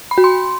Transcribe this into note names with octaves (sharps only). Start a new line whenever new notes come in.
B5
F#4
C6